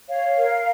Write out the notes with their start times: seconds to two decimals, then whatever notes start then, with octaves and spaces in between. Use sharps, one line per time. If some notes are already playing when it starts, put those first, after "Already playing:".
0.08 C#5 F5
0.37 A#4